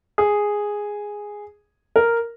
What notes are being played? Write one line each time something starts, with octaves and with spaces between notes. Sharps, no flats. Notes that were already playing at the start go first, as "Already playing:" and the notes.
G#4
A#4